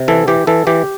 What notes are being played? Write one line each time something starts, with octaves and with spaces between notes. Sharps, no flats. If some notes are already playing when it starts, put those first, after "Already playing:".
Already playing: C3
E3 A4
E3 G4
E3 A4
E3 G4